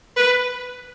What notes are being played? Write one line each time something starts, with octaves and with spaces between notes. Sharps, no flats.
B4